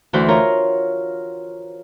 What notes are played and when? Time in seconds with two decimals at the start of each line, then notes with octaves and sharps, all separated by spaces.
0.13 D2 E3 F#4 C5
0.28 F4 A#4 C#5 A#5